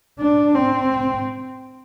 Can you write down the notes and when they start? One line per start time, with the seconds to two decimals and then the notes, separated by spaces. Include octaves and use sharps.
0.19 D4
0.54 C4